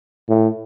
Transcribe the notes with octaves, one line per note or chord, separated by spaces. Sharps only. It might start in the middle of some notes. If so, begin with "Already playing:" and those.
A2